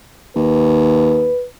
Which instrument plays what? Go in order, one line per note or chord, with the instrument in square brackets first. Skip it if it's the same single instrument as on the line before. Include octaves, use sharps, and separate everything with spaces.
[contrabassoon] D#2 [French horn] B4